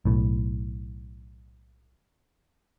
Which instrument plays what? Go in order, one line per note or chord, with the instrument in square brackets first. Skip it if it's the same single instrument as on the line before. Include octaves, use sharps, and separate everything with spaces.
[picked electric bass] B1 A2